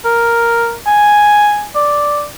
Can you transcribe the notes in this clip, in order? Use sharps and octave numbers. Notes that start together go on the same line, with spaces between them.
A#4
G#5
D5